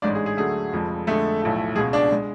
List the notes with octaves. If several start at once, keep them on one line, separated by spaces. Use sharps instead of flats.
A1 G#2 G#3 D4 D5
G#4
G#4
D2 D3 F#3 A3 G#4
F1 F2 F3 G#3
F2 D3 G#3 A3 A4
B1 A2 F3 A3
C#2 B2 G#3 G#4
D4 D5
G#3